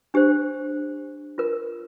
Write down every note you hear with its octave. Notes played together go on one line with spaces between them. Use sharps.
D4 G4 C5
F4 A#4